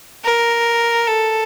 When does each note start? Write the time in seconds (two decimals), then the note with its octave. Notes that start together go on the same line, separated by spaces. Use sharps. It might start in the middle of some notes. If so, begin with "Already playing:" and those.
0.25 A#4
1.07 A4